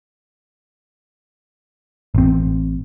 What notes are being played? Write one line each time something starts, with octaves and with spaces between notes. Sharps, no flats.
A1 C4